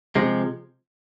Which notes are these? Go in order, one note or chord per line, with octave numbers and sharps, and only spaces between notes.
C3 F3 G#3